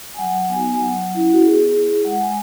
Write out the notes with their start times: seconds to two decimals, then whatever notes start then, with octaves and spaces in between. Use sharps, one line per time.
0.14 G#5
0.19 F#3 F#5
0.49 B3 D#4 F#4 G#5
0.70 G#5
0.80 F#3 F#5
1.11 C#4 E4
1.33 F#4
1.42 B3 G#4
1.74 E4
2.04 G#3 F#5
2.20 G#5